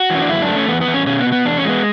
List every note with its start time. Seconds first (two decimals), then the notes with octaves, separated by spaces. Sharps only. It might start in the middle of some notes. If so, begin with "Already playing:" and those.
Already playing: F#4
0.10 E3
0.15 C#4
0.22 D4
0.29 F#2 E4
0.42 D4
0.49 A3
0.55 C#4
0.67 E2 B3
0.81 B3
0.88 E2
0.94 C#4
1.07 B2 C#4
1.20 B3
1.26 B2
1.32 B3
1.45 E2 D4
1.57 C#4
1.65 G#3 B3